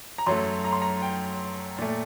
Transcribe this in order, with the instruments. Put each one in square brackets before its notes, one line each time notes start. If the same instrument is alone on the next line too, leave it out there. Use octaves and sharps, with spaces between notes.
[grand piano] A#5
F#2 F#3 A3 C6
A#5
C6
A#5
G5
A#2 A3